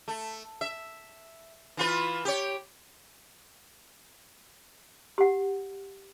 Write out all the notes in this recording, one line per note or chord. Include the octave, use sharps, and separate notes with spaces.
A3
E5
E3 F4 B4
G4 C#5
G4 F#5